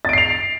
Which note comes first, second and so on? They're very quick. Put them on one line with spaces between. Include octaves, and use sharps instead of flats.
A6 D7 C7 F7